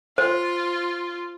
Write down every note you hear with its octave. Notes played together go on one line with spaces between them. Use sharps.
F4 C5